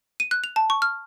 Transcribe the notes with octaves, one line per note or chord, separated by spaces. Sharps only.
D#7
F#6
F7
A5
C#6
F6